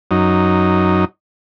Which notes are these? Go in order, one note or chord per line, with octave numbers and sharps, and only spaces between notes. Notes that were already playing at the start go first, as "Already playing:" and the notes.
F#2 D#4